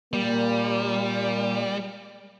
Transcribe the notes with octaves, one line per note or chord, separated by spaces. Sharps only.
A#2 G3 A#3